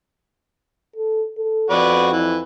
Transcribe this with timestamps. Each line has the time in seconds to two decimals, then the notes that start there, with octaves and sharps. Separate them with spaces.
0.96 A4
1.37 A4
1.70 F2 F#4 B4 D5
2.13 E3